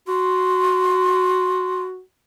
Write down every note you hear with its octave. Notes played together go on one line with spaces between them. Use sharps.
F#4 C6